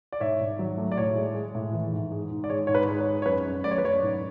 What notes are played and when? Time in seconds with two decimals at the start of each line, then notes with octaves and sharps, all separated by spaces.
0.12 D5
0.20 G#2 C#5 E5
0.40 G#2
0.59 F#3
0.77 A3
0.92 D5
0.97 A2 C#5
1.16 G#3
1.35 G#3
1.55 A2
1.74 E3
1.92 G#2
2.12 G#3
2.31 G#2
2.44 D5
2.50 G#3 C#5
2.67 G#2 C#5
2.75 B4
2.88 G#3
3.01 C#5
3.07 G#3
3.22 C#5
3.26 F#2 B4
3.46 F#2
3.64 A3 D5
3.71 C#5
3.78 B4
3.83 F#2 C#5
4.03 G#2